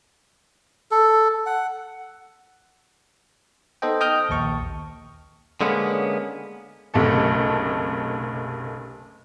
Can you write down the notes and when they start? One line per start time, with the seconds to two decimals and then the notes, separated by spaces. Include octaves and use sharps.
0.91 A4
1.46 F#5
3.82 B3 D#4 A4 C5 D#5 G5
4.00 D#5 G5 D#6 F6 G6
4.29 A#1 D#2 A5 C#6
5.61 D3 G#3 A#3 B3 C#4
6.94 F#1 B1 C3 A3 A4